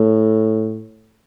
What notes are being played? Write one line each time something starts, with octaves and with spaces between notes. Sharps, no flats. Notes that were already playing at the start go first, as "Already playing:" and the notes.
Already playing: A2